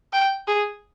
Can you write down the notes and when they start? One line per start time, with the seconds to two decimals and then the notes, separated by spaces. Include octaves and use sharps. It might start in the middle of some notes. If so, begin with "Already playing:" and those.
0.13 G5
0.47 G#4